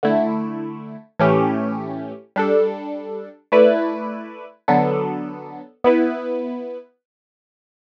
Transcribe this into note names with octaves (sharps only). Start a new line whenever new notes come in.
D3 A3 E4
A2 E3 A3 C#4 G4
G3 D4 A4
A3 E4 B4 D5
D3 F#3 B3 D4 A4
B3 E4 B4